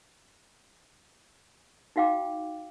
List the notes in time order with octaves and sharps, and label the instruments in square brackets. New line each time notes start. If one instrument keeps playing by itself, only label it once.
[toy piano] D#4 F#4 F5 G5 D6